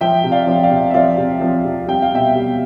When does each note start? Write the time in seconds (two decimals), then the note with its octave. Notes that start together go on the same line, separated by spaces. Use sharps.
0.01 F3 E5 G5
0.24 C3
0.32 D5 F5
0.47 F3
0.63 D5 F5
0.71 C3
0.90 E5
0.94 F3 D5 F5
1.18 C3
1.41 F3
1.64 C3
1.88 G3 G5
2.02 F5
2.12 B2 E5 G5
2.36 G3